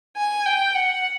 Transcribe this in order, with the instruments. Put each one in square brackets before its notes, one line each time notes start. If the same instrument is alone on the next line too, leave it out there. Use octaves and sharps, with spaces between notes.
[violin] G#5
G5
F#5